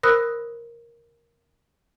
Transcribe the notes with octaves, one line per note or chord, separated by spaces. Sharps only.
A#4 C5 B5 D#6 E6 F#6